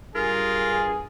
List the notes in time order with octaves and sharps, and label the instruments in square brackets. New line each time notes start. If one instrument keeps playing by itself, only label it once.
[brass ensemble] G2 G#4 [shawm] F4 [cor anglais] A#4